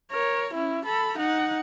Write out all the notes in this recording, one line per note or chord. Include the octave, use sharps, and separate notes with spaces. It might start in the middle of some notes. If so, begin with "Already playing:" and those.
A#4 C#5
C#4 E4
A4 B5
D#4 F#5